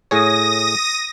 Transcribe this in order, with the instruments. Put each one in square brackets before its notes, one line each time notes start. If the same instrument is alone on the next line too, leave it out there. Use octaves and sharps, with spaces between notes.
[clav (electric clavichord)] A2 G#4 C#5 [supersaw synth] D#6 A#6